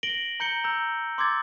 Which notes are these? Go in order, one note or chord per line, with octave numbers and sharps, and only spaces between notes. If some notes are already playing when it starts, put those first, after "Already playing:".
A#6 D7 F#7 G7
A#5 G6 C#7 G7
A#5 E6 G6
C6 D6 E6 G#6 A6